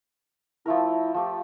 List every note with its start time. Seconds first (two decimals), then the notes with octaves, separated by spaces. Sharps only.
0.66 F3 A3 E4 A#4
1.14 F3 A3 G4